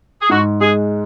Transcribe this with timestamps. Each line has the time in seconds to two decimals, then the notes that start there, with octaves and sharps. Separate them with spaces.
0.21 G#4
0.29 G#2 F#4
0.61 G#3 G#4